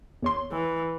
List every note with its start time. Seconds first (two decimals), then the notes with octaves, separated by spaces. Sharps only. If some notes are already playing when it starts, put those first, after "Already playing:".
0.22 E2 C#5 C6
0.51 E3